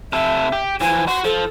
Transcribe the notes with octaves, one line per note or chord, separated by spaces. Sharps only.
C3 A4 E5
G4
E3 F3 G#5
F#4 C6
F3 A4